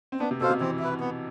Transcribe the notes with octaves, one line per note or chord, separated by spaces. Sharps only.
C4
B3 D4
C3
B2 A4 C5 F5
C3
E3 C4
E4 B4
B3